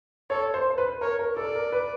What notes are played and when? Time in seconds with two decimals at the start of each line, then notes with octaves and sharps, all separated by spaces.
0.30 A4 C#5
0.54 C5
0.70 C5
0.78 B4
1.01 A#4 C#5
1.19 A#4
1.37 A4 D5
1.55 A#4
1.72 B4